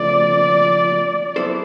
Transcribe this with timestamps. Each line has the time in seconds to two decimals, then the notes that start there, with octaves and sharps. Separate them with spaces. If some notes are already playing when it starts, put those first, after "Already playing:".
Already playing: C#3 F3 A3 C4 D5
1.36 F#3 B3 E4 A4 C5